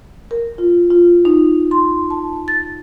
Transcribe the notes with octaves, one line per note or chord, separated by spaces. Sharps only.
A#4
F4
F4
D#4
C6
A5
A6